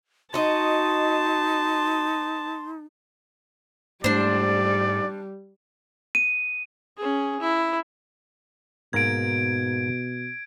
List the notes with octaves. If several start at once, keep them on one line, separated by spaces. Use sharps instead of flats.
D#4 F#4 D#5 A5 C6
G#2 G3 A3 D4 C5 D5
D#7
C#4 G#4
E4
G#2 B2 A#3 A#5 G#6 D7